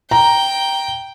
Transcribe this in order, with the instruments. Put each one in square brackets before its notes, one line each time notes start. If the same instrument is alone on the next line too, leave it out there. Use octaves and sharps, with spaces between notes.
[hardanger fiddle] G5 [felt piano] A#5